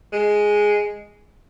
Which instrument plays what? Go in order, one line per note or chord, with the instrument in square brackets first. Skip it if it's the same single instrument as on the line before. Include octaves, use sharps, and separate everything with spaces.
[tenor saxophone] G#3